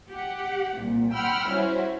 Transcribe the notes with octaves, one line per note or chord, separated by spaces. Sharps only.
G4 F#5
C2 A#2
F#5 G5 B5 C6 E6 F6
G3 C#4 E4 F#4 C5